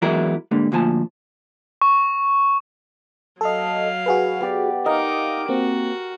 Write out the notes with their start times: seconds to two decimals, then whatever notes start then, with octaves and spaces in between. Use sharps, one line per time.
0.02 E3 F#3 G#3 B3 E4 A#4
0.51 G#2 D3 G3 A#3
0.72 D2 A#2 F3 G#5 A5
1.82 C#6
3.41 F#3 A4 D#5 F5
4.06 F#4 G#4 B4
4.41 B3 G4 D5
4.86 D#4 A#4 D#5 F5 D6
5.49 A#3 C4 F#4